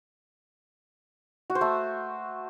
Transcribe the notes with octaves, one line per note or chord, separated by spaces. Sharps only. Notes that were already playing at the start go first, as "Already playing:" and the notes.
F#4
C5
A3